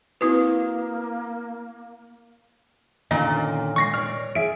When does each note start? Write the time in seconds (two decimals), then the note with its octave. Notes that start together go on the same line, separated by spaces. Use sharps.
0.21 A#3 C4 E4 F#4 B4 D#6
3.11 A#2 D3 D#3 C#4 D#5 A#5
3.76 G#3 C#6 A#6 C7
3.94 C#5 D5 F6
4.35 G#4 E5 D7